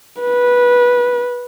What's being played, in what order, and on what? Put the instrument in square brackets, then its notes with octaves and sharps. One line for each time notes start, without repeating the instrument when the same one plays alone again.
[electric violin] B4